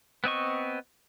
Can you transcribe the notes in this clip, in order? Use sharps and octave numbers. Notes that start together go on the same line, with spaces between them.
B3 C4 D#5 C#6